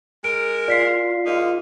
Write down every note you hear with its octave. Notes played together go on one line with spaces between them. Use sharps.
G#3 A#4 D7
F4 D5 B6 C7
G#2 A#3 D#4